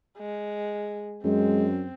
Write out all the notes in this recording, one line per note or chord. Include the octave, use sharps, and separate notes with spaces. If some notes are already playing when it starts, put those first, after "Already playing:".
G#3
F#2 G#3 C4